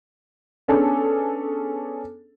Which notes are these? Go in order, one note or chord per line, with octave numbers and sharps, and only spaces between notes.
B3 C#4 D4 G#4 A4